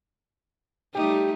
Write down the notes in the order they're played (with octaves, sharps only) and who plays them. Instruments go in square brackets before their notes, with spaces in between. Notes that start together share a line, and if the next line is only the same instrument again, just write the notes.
[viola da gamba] G3 A3 D#4 [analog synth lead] G4